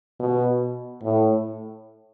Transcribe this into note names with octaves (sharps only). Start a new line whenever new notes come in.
B2
A2